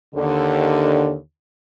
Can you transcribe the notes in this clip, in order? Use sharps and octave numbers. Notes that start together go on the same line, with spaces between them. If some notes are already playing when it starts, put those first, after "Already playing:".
D#2 D3